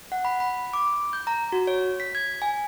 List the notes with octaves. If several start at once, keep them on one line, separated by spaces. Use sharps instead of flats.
F#5
B5
B5
D6
G6
A#5
F#4
C#5
B6
G#6
G#5